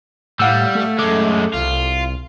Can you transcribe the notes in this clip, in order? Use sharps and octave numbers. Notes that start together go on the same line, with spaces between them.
A2 G3 F5 F#5 E6
A3
F#2 G#3 A4 D6
C2 F4